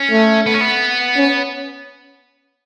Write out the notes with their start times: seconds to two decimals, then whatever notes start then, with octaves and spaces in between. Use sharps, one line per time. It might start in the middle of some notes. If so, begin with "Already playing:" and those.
Already playing: C#4
0.11 A3
0.46 B3
0.54 C#4
0.61 B3
1.16 C#4